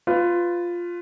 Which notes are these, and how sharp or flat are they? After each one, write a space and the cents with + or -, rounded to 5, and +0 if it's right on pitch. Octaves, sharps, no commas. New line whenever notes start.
F4 +0 B4 +20